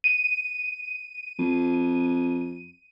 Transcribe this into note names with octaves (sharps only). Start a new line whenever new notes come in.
D#7
F2